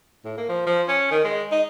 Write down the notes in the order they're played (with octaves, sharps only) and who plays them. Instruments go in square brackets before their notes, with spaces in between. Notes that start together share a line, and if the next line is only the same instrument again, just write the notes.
[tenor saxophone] A2
A#3
F3
F3
C#4
D#3
G#3
D#4